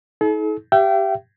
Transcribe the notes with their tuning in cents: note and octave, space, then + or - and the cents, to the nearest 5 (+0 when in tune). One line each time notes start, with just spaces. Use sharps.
D#4 +45 A4 -45
G4 +0 E5 +40 G5 -25